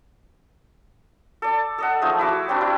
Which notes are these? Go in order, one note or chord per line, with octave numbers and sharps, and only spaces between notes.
A4 D5
A4 D#5 F#5
F3 A3 D#4 G#4
E4 F#4 D6
G3 C4 D4 F#4
E4